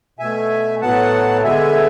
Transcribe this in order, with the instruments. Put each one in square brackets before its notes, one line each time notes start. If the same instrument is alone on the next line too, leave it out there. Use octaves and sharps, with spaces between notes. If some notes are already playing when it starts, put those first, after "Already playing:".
[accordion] B2 A3 E5 G#5
A2 F#3 B3 F#5 A5
D3 G#3 B3 E5 G#5